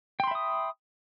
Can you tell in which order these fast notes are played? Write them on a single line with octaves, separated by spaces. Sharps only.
G5 C6 B5 E5 D#6